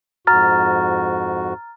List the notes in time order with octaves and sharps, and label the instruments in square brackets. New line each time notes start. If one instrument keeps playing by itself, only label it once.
[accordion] F2 G#2 F#4 [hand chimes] A#5 F6 A6